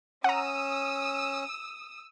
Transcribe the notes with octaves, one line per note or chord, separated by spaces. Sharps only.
C#4 F#5 A#5 D#6 E6